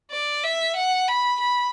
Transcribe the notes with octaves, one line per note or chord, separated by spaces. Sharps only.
D5
E5
F#5
B5
B5